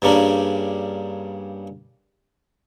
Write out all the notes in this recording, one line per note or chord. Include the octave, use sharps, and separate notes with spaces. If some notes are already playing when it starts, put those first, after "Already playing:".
G2 C#3 G3 A#3 D4